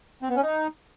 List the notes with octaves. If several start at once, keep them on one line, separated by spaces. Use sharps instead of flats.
C4
B3
C#4
D#4